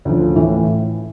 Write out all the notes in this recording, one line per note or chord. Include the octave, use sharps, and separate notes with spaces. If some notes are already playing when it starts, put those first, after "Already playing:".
D2 C#3 F3
A2 E3 A3